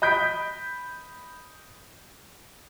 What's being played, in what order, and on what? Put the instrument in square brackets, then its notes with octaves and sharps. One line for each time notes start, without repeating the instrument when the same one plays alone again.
[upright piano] D#5 B5 G6 B6 D7